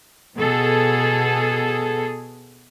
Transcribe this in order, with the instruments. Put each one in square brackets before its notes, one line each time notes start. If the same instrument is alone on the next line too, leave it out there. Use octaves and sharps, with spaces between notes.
[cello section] B2 G#4 A4